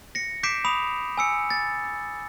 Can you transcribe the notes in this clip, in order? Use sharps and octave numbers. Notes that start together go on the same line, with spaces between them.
A#6 C#7
D6 G6 B6 C7 D7 E7
B5 D#6 F7
G#5 E6 C#7
A6